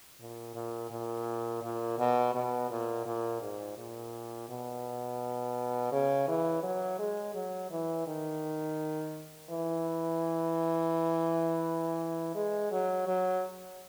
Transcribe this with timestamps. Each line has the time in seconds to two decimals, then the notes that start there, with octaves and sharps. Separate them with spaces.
0.20 A#2
0.55 A#2
0.91 A#2
1.63 A#2
1.99 B2
2.35 B2
2.70 A#2
3.06 A#2
3.41 G#2
3.78 A#2
4.49 B2
5.92 C#3
6.28 E3
6.63 F#3
6.99 G#3
7.35 F#3
7.71 E3
8.07 D#3
9.50 E3
12.35 G#3
12.72 F#3
13.07 F#3